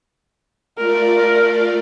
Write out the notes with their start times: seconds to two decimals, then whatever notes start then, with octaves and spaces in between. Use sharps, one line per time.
0.77 A3 F4 A#4 D5